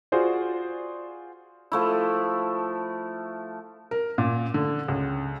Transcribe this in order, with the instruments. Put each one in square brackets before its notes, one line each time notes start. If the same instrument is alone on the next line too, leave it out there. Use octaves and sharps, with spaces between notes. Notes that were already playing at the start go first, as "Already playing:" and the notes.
[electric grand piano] F4 F#4 G#4 C5 D5
[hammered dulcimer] F3 A3 E4
[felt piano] A#4
A#2
D3
C#2